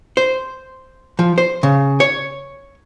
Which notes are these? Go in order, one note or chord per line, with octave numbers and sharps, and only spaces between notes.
C5
F3
C5
C#3
C#5